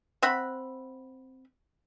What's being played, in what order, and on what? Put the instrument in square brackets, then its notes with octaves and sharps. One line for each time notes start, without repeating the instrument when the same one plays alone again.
[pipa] C4 E5 F#5 B5